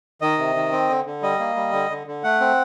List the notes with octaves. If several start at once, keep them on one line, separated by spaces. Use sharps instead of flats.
D#3 D#5
C3
D#3
C4
D3
D3
G3 D#5
A#3
G3
D3
D3
D3
A3 F#5
C4